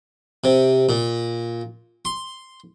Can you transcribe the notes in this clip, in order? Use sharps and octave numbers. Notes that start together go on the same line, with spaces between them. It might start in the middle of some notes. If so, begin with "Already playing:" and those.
C3
A#2
C6